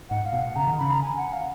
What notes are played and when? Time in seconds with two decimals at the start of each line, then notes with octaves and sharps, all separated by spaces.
0.10 G#2 F#5
0.26 F5
0.33 B2
0.41 F#5
0.56 C#3 A#5
0.68 D#3
0.78 C#3 B5
0.91 A#5
1.02 G#5
1.17 F#5
1.33 F5